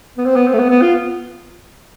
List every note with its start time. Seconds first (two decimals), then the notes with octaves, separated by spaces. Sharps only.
0.18 B3
0.26 C4
0.36 B3
0.48 C4
0.54 A3
0.59 B3
0.70 B3
0.82 F4